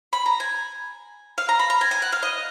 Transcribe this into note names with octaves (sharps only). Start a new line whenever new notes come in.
B5
A#5
G#5
F5
A#5
B5
A#5
G#5
G#5
F#5
F5
D#5